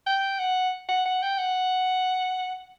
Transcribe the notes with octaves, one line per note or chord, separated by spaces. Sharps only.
G5
F#5
F#5
F#5
G5
F#5